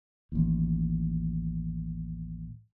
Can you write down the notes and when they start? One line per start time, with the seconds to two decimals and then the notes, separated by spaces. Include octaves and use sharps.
0.32 A1 D#2